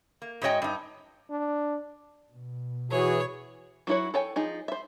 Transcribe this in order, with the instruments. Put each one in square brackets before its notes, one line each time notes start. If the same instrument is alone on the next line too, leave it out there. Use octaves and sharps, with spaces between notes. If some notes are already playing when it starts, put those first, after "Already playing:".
[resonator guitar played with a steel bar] A#3
G#2 G#3 F#4 C#5 D#5 G5
G2 D#4
[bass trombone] D4
[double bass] B2
[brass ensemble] E3 G#4 [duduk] F#4 [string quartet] C#5
[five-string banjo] F#3 D#4 E4 F#4 C#5
A4 C#5 G5 G#5
F3 D#4 G#4
C5 E5